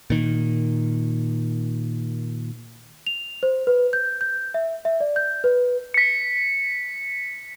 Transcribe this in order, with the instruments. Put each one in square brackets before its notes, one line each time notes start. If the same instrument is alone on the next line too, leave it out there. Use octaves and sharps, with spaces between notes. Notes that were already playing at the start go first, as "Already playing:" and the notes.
[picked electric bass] A#2 D#3
[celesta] F7
C5
B4
G6
G6
E5
E5
D5
G6
B4
[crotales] B6 C#7